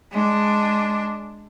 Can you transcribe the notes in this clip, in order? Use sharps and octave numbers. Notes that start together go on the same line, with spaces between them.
G#3 D4